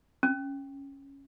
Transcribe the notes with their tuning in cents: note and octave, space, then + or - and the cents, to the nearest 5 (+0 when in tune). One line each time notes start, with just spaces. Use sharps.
C#4 -5